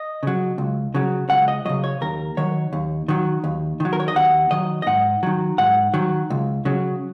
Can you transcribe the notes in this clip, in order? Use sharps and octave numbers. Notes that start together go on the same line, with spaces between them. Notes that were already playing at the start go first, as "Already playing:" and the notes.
Already playing: D#5
C#3 F#3
C#2
C#3 F#3
C#2 F#5
D#5
C#3 F#3 D#5
C#5
D#2 A#4
D#3 F#3 C#5
D#2
D#3 F#3
D#2
D#3 F#3
A#4
C#5
D#5
D#2 F#5
D#3 F#3 D#5
D#5
G#2 F#5
D#3 F#3
G#2 F#5
D#3 F#3
C#2
C#3 F#3